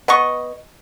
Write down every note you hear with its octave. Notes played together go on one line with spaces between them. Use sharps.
B3 D#5 C#6